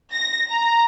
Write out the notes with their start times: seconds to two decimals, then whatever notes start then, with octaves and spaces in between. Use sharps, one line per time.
0.13 A#6
0.52 A#5